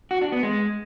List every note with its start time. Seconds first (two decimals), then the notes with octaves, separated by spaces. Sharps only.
0.11 F#4
0.22 D4
0.32 B3
0.43 G#3